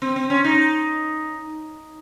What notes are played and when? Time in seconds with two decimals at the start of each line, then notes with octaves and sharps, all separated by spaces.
0.02 C4
0.16 C4
0.30 C#4
0.44 D#4